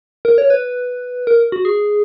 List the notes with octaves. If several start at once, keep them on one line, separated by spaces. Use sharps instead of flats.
A#4
C#5
B4
A#4
F#4
G#4